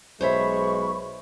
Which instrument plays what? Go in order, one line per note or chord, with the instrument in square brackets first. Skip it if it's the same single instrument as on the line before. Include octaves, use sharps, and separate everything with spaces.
[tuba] B1 [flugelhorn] G#3 [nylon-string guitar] C5 C#5 E5 [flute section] B5 C#6